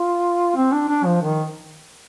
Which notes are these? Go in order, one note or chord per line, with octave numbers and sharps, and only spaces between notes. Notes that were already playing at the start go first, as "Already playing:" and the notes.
Already playing: F4
C4
D4
D4
F3
D#3